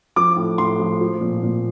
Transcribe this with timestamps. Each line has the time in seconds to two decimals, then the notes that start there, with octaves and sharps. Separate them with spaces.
0.16 F3 D6
0.37 A2
0.58 A2 C6
0.79 F3
1.01 F3
1.21 A#2
1.43 A#2